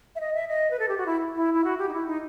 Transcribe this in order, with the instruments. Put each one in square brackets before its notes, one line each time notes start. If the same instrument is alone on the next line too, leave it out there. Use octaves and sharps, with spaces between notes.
[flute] E5
D#5
E5
D#5
B4
A4
G4
F#4
E4
E4
E4
F#4
G4
D#4
E4
D#4